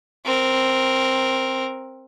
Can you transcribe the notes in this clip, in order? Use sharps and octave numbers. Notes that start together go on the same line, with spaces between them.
C4 A#4